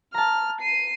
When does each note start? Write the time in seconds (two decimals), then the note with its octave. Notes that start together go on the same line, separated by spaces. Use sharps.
0.14 A5 A#5 F6
0.61 C7 D#7